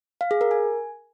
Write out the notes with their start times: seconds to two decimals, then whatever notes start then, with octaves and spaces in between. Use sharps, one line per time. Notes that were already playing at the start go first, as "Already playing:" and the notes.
0.21 F5
0.31 G#4
0.41 A#4
0.51 G#5